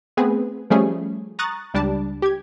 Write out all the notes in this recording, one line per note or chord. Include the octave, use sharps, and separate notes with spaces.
A3 B3 C4 G#4 B4
F3 G3 A3 C#4 G#4
A#5 C#6 D#6 F#6 A6
C#2 G3 D4 D5 A5
G4 G#6